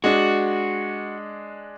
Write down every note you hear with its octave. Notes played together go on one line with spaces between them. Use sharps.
G#3 D4 F#4